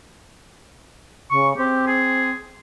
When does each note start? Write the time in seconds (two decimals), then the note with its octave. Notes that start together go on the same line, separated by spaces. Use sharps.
1.30 C#3 C#6
1.57 C4 G4
1.87 G#4